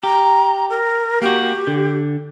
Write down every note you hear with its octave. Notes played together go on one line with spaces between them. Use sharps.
G4 A#5
A#4
A#3 F#4 G4
D3